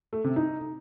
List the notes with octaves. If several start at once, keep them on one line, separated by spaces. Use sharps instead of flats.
A3
C3
D#4